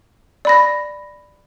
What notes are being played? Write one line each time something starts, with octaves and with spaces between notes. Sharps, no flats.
D5 B5 A#6